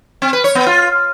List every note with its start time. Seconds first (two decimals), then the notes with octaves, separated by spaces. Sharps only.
0.22 C4
0.33 B4
0.44 C#5
0.55 B3
0.66 F4